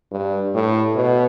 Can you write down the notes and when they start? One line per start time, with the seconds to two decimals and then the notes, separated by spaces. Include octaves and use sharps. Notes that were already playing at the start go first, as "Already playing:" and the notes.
0.12 G2
0.54 A2
0.96 B2